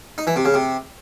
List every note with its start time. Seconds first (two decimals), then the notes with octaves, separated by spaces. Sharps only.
0.18 D#4
0.27 E3
0.36 C3
0.45 C#3
0.54 C3